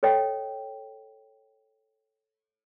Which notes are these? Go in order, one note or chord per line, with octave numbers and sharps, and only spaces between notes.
A4 C#5 D#5 G5